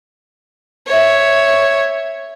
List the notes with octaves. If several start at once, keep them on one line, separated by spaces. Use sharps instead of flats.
C#5 E5